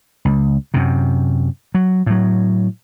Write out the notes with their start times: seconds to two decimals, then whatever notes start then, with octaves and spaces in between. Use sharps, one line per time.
0.25 C#2
0.74 F#2 C3
1.75 F#3
2.06 A2 F#3